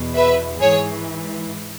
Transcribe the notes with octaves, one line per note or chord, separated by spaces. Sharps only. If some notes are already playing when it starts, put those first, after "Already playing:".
Already playing: E2 B2
B4 E5
G#2 E3 G#4 C#5